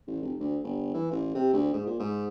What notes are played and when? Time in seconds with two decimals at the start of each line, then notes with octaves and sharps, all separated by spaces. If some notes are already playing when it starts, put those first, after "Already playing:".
0.08 A1
0.22 F1
0.40 D2
0.64 G1
0.94 E3
1.12 A1
1.35 C3
1.54 D2
1.73 G#2
1.87 A#2
2.00 G#2